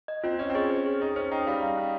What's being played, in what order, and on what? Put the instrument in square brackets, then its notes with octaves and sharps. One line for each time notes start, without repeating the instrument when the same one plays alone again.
[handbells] D#5
[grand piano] C4 [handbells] F4
[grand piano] C#4 [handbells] D#5
[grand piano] C4
[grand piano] C#4 [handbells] G#4
[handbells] C5
G#4
[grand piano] D#4 [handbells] G#4
[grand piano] C#4 [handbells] C5
[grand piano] D#4 [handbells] G5
[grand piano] G3 [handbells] F5
[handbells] F5
C#4